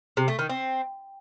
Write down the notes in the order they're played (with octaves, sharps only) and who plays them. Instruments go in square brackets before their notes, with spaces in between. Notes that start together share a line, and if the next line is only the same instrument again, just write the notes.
[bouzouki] C3
A3
D#3
C4